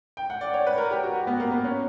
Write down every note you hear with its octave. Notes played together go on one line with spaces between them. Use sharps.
G5
F#5
D5
C#5
B4
A#4
G4
F#4
F#4
B3
A#3
B3
C#4